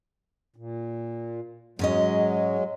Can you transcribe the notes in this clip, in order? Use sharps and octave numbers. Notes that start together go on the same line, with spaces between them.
A#2
G#2 F#3 G#3 C#4 D#5